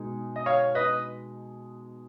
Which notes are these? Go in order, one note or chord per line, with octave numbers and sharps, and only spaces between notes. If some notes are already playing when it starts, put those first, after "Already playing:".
Already playing: B2 G#3 D#4
D#5
C#5 F5
B4 D#5